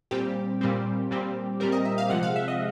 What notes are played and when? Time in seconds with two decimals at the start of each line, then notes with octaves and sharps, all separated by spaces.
0.11 A#2 G3 C4 G4
0.61 A#2 G3 C4
1.11 A#2 G3 C4
1.60 A#2 G3 C4 A#4
1.72 D#5
1.85 E5
1.98 F5
2.10 C3 F3 G#3 F#5
2.23 F5
2.36 E5
2.48 D#5